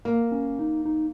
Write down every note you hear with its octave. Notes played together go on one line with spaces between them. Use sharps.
A#3
C#4
D#4
D#4